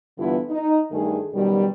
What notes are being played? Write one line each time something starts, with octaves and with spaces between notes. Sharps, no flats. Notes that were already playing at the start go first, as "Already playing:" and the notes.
G2 D3 E3 B3 E4 F4
D#4
G2 D#3 A3 G#4
F#2 B2 D#3 G3